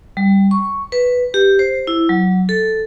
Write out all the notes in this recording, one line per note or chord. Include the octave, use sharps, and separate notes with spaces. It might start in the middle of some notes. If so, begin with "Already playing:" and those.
G3
C#6
B4
G4
C5
E4
F#3
A4